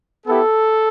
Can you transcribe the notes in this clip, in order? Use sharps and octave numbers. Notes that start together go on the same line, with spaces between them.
B3 E4 G4 A4